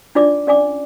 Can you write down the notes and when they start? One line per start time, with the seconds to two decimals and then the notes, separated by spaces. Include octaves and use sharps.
0.15 D4 D#4 F4 D5 D6
0.47 C#4 D5 G#5 D6